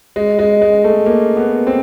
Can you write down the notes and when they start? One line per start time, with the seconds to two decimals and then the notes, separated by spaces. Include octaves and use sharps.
0.16 G#3
0.39 G#3
0.62 G#3
0.84 A3
1.06 A#3
1.37 B3
1.67 C4